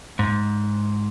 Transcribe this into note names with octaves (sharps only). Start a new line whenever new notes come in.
G#2